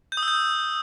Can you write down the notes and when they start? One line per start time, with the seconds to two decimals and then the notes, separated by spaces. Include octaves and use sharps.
0.12 G6
0.17 D#6
0.23 E6
0.28 G6